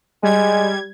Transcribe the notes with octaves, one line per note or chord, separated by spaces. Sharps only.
G3 G#3 G#6